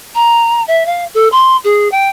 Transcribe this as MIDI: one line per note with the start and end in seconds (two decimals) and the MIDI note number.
0.15 0.63 82
0.68 0.86 76
0.86 1.05 77
1.14 1.28 69
1.32 1.57 84
1.64 1.88 68
1.92 2.09 79